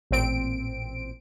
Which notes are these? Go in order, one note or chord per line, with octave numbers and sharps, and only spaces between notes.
A1 A#2 C4 D7